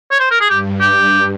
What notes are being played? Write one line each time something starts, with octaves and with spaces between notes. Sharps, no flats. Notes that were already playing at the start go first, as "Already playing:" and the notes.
C#5
C5
A#4
G#4
G2 G4
G4